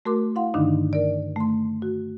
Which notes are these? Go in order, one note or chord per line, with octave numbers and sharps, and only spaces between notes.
A3 F#4 A#4 C6 D6
E4 F5 F#5 C6
G2 D3 D#3 D4 D#4
A#4 D5
A3 C6
F#4